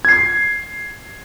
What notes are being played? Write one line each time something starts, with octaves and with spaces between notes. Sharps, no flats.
G#6 C7